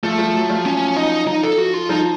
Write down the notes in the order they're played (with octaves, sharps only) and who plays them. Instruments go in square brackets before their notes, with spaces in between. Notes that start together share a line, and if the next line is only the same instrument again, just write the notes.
[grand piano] F3 [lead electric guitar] A3
[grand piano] F3
F#3
F3
[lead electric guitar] C#4
D#4
D#4
A4
F#4
F4
[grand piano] F3 [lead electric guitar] D#4